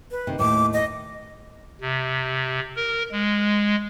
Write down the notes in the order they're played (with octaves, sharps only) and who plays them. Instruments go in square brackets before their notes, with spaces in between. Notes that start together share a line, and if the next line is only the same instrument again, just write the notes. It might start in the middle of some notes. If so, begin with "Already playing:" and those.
[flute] B4
[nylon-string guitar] C3 D#3
[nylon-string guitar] D#2 A2 [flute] D6
[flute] D#5
[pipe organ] C3
A#4
G#3